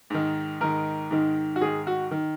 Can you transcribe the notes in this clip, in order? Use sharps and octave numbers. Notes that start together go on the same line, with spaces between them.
G#2 D#3
G#2 D#3 A#4
G#2 D#3
F#4
G#2 D#3 G#4
F#4
D#3